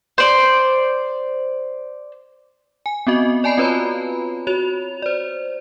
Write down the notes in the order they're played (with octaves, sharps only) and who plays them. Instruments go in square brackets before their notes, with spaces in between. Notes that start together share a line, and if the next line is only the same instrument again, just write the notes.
[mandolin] C5 D5
[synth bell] G#5
B3 C4 F#4 D#5
D5 G#5 A5 B5 C7
C4 F4 B4 C#5 A#5 B5
F#4 C#5 F7
C5 D5